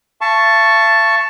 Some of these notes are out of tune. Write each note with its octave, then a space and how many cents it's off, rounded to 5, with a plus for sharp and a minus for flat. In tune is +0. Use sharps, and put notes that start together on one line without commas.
E5 +45 A5 +0 C#6 +0